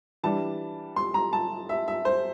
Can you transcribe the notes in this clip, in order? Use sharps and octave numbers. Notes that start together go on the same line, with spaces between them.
E3 G3 D4 A5
C6
A#5
A5
E5
E5
C5